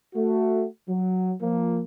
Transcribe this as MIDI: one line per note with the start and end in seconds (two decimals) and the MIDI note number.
0.15 0.65 57
0.15 0.65 66
0.89 1.33 54
1.41 1.82 53
1.41 1.82 58